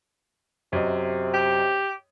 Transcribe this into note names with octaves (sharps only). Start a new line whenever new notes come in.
F#2 C3 D#5
G4